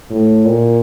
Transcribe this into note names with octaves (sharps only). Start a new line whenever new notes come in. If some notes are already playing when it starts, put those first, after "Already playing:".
A2
A#2